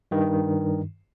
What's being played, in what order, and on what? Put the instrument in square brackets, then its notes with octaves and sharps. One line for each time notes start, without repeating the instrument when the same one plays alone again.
[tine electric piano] G2 D#3